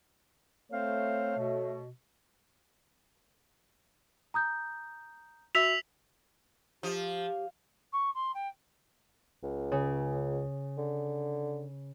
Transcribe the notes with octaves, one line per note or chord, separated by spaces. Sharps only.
A3 C4 C5 C#5 F5
B2
A#5 D#6 G6
F#4 E5 E6 B6 F7
F3 G4
C#6
C6
G5
C#2
C#3
D3